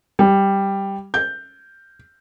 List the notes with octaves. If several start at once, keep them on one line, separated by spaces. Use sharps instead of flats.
G3
G6